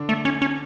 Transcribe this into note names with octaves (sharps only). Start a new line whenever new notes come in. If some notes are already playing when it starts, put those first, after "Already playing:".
Already playing: D3 D4
A3
C#4
C#4